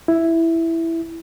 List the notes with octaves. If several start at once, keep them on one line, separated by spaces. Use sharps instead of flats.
E4